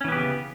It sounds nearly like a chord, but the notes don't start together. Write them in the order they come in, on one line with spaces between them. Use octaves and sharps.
C#4 E3 B3 G4 C#3